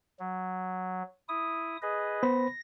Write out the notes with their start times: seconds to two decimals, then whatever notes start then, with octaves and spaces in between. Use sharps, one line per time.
0.20 F#3
1.29 E4 D#6
1.82 G#4 B4 D#5
2.23 B3 C5 B5 A#6